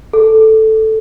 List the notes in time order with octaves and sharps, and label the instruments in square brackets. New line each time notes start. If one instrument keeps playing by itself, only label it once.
[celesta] A4